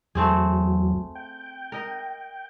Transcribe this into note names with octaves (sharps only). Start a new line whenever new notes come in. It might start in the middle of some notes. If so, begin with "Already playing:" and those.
E2 F#3 A3 C4 G#4
G5
A#4 D#5